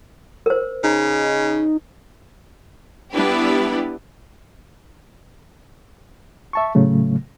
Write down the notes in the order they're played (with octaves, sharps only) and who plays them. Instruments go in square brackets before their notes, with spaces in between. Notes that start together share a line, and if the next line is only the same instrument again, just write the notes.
[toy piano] A#4 C5
[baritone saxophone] C#3 [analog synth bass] D#4
[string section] G3 B3 D4 E4 G4 B4
[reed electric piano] E5 A5 C#6
A2 C#3 F#3 A3